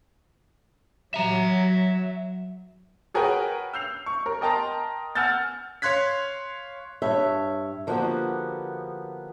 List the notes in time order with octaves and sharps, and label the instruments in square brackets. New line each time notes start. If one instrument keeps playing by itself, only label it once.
[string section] F#3 [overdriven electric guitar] E5 A#5
[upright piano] F#4 G#4 A#4 B4 C#5 G5
E6 G6 C7 F7
C#6
A#4
A#4 D#5 G5 A5 A#5 C6
F#5 G#5 E6 F6 G6 A6
[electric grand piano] C#5 F5 C6 F#6 G#6 B6
[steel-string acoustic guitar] G2 C#5 E5
D3 F3 A#3 B3 F#4 G4